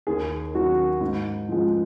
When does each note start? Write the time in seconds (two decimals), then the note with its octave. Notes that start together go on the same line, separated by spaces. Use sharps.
0.07 D#2 G#4
0.54 D#3 F#3 F#4
1.01 G#2
1.49 F3 G#3